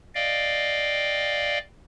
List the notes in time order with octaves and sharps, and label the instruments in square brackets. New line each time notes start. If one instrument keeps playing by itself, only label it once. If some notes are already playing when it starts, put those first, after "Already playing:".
[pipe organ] D5 D#5 F5 G5